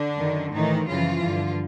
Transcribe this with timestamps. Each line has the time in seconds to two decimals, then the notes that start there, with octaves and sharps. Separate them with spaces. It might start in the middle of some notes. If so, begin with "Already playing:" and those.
Already playing: D3 D4
0.18 F#2 D#3
0.53 A2 D#3 E3 D#4
0.87 F#2 C#3 E3 F3 F4
1.23 G2 D3